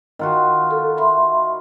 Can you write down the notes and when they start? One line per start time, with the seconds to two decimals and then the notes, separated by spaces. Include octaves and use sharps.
0.19 D#3 F4 F#4
0.71 A4
0.98 E5 B5 C6